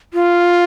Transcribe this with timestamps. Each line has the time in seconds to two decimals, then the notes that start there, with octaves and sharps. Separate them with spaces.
0.14 F4